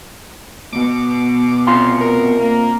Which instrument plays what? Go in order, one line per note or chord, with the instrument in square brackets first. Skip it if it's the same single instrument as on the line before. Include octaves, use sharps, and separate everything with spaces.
[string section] B2 [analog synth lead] D6
[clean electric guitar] C3 F4 C6 [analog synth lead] F5
[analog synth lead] A#4
[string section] A#3